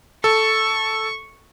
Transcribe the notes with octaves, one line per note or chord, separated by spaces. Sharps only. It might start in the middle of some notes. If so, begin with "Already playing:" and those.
A4 C#6